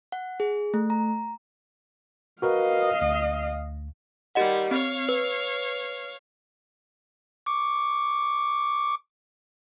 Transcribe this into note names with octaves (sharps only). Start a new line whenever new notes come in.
F#5
G#4
A3
A#5
F#4 A#4 B4 D#5 F5
D2
D#3 G3 G4 D#5 F#5
C4 C#5 F5
B4
C#6 D6